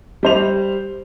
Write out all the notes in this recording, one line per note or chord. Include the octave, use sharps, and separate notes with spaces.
G3 C5 F7